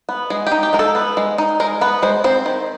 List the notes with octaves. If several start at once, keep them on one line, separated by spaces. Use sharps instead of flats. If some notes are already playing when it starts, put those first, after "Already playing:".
B3
G#3 G#4
G4
D#4
G4
G#3 A#4
A4
B3
G#3
D#4
G#3 A#4
B3 B4
G#3 C5
C4 C5
D#3